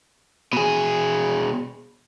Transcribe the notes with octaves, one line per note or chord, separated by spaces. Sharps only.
B2 G#4